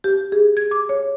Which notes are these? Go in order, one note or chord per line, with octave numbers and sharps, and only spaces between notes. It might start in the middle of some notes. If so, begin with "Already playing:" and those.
G4
G#4
G#6
D6
C#5